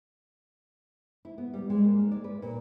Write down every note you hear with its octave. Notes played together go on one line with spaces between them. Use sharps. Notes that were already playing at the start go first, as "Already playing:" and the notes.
E4
B3
G3
G#3
A#3
D#4
D5
B4
A#2